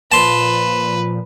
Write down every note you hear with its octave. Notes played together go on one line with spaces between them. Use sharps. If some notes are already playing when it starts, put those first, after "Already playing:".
A#2 F3 B4 A5 C6